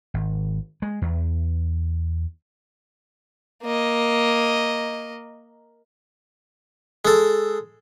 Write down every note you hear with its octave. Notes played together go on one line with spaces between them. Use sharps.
G#1
G#3
E2
A#3 D#5
G#3 A4